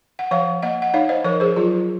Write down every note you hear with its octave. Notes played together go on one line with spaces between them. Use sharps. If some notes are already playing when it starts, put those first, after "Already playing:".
F#5
F3 C#5 F5
A#3 D#5 F#5
F#5
D#4 C#5 F5
C5 D#5
F3 A#4 C#5
G#4 C5
F#3 F4 G#4